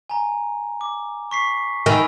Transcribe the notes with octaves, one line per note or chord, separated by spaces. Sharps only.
G#5 A#5
D6
C#6 B6 C7
D#3 G#5 B5 E6